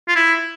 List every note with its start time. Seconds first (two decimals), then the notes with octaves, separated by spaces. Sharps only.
0.08 F4
0.16 E4